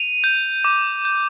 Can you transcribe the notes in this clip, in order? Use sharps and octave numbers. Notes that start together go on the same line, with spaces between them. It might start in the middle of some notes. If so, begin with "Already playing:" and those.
Already playing: D#7 F7
G6
D6
G6